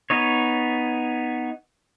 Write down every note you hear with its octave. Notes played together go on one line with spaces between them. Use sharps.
B3 D#4 C#5